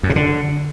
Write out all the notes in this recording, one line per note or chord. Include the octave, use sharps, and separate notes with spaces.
F#2
C3
D3